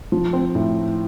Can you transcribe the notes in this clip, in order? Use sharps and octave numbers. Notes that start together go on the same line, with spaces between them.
F3
C4
A2